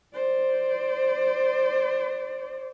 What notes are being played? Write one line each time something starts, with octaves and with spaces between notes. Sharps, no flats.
C5 D5